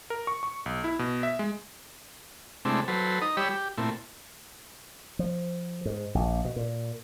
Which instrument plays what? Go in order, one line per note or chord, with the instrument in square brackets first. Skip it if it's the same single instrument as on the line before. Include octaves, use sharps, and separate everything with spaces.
[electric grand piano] A#4
C#6
C#6
B1
E4
B2
E5
G#3
[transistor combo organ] C3 G#3 A3 C4 D4 E4
F#3 A4 B4 C5
D#4 D#5
G3 G4 C#5 B5 E6
G4
A#2 A3 C4 E4
[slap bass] F3
G#2
A#1
B2
A#2